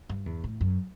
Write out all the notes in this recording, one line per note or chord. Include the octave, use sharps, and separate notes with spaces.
G2
E2
A2
F#2